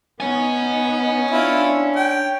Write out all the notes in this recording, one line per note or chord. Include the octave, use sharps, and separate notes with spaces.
B3 D#4 C#5 G#5
D4 E4 F4
G5